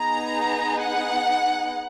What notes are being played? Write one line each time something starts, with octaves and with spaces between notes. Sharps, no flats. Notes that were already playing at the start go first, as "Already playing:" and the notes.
Already playing: B3 D#4 G#4 A#5
F#5